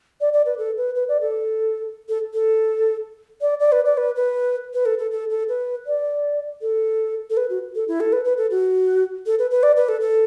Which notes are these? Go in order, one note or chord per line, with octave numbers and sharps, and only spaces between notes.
D5
D5
B4
A4
B4
B4
D5
A4
A4
A4
D5
D5
B4
D5
B4
B4
B4
A4
A4
A4
A4
B4
D5
A4
A4
B4
F#4
A4
E4
A4
B4
B4
A4
F#4
A4
B4
B4
D5
B4
A4
A4